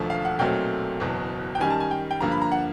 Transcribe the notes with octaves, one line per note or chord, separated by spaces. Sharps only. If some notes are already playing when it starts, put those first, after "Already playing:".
Already playing: E1 D#2 D3 F3 A3
F5
F#5
B1 A#2 F#3 A3 C4 G5
F#1 E2 B2 F#3
G5
F#2 D#3 G3 G#5
A5
G#5
G5
G5
G2 D3 F3 A#3 A#5
B5
A#5
F#5